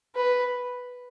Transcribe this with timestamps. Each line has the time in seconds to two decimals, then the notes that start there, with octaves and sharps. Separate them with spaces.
0.15 B4